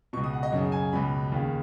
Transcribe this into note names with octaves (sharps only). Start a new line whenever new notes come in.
C#2 B2 C#6
D#6
F#5
D#5
F#2 C#3 F#5
G#5
C#2 B2 B5
D#2 C#3